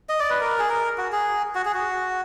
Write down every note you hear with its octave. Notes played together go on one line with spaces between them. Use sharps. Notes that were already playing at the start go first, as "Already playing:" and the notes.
D#5
D5
B4
A#4
G#4
A#4
F#4
G#4
F#4
G#4
F#4